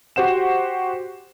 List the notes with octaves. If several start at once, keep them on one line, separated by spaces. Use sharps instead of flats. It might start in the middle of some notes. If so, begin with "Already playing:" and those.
F#4 G4 C5 F#5 E7